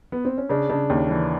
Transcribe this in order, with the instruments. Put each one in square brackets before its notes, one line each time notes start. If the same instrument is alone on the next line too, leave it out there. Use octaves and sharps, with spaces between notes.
[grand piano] B3
C4
C#4
[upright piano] C#3 [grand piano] D4
[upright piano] C#3 [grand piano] D4
[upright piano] D#2 [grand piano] C#4
[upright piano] E3 [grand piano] D4